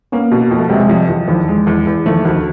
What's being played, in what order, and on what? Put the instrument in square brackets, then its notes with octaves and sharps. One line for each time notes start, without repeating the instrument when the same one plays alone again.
[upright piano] A#3 [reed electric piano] B3 C#4
[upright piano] B2
F2
[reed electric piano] A3
[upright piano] C3 [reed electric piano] F#3 G#3
[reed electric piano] G#3
[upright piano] F2 [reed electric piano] F3 G3
[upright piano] F2 [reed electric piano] E3 F#3
[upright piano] E2 [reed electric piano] D#3 F3
[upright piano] G#3
E2
E2
[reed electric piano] D#3 F3 [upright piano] A3
[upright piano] D2 [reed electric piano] D#3 F3